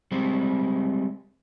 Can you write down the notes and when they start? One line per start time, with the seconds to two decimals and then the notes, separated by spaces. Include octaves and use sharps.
0.11 G3 G#3 C4